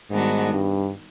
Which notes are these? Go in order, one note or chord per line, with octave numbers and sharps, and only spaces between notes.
G#2 D#3 G3 B3 D4 F#4
G2